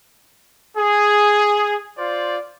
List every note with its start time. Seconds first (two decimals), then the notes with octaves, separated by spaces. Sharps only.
0.78 G#4
1.98 F4 C5 D5